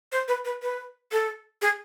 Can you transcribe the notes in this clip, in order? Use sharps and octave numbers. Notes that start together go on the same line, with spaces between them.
C5
B4
B4
B4
A4
G#4